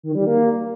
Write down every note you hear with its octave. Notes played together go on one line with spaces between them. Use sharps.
D#3
G3
A#3